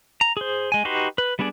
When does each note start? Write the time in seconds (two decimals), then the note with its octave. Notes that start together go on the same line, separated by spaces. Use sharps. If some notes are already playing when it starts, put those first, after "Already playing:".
0.21 A#5
0.37 G#4 C5
0.72 G#3 G#5
0.85 D#4 F#4 G4 B4 C6
1.18 B4
1.39 G3 B3 D4 G#4 D5